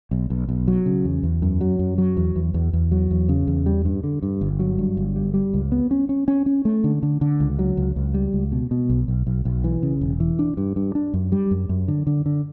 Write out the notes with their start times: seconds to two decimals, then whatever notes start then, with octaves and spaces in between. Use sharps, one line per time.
0.11 B1
0.30 B1
0.49 B1
0.68 F#3
0.86 C#3
1.05 E2
1.23 E2
1.42 F#2
1.61 F#3
1.79 F#2
1.98 F#3
2.17 E2
2.36 E2
2.54 E2
2.73 E2
2.92 F#3
3.11 E2
3.29 C#3
3.47 E2
3.66 G3
3.85 G2
4.04 D3
4.23 G2
4.41 G1
4.60 F#3
4.78 G2
4.97 G1
5.16 G3
5.34 G3
5.54 C#2
5.72 B3
5.91 C#4
6.09 C#4
6.28 C#4
6.46 C#4
6.65 A3
6.84 D3
7.03 D3
7.21 D3
7.40 C#2
7.59 F#3
7.77 C#2
7.96 C#2
8.14 G3
8.33 C#2
8.52 B2
8.71 B2
8.90 B1
9.08 B1
9.27 B1
9.45 B1
9.64 E3
9.83 C#3
10.01 E1
10.20 E3
10.39 D4
10.57 G2
10.76 G2
10.95 D4
11.14 F#2
11.32 G3
11.51 F#2
11.69 F#2
11.88 D3
12.07 D3
12.26 D3